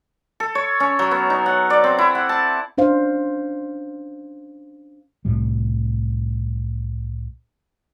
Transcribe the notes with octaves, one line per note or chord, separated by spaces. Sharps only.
A4
C#5
C#4
F#3
B3
D#4
F#5
D5
C4
E4
F#5
A5
C#4 D4 C5 F5
C2 A2 G3